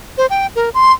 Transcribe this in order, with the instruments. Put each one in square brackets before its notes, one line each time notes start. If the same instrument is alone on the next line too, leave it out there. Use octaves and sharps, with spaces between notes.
[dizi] C5
G5
A#4
C6